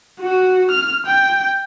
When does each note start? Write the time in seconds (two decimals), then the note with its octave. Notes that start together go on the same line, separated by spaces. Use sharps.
0.20 F#4
0.71 F6
1.06 G5